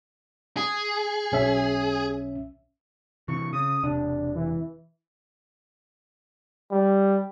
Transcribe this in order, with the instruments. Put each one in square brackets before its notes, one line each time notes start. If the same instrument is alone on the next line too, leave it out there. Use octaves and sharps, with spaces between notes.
[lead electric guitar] G#4
[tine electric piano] B1 C#4 E5
[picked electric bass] C3 E3 [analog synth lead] C#6
[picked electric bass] C#3 [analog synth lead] D#6
[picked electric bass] E1 C3 [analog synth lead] D4
[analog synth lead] E3
[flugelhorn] G3